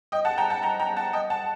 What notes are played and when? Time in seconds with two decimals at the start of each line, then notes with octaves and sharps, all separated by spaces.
0.12 D#5 G5
0.25 F#5 A5
0.38 G5 A#5
0.50 F#5 A5
0.63 G5 A#5
0.80 G5 A#5
0.97 F#5 A5
1.13 D#5 G5
1.30 F#5 A5